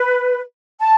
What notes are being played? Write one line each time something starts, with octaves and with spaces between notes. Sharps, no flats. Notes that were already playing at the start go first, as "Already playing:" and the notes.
Already playing: B4
A5